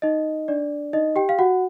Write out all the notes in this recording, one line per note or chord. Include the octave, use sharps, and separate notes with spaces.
D#4 D#5
D4 D5
D#4 D#5
G4 G5
F5
F#4 F#5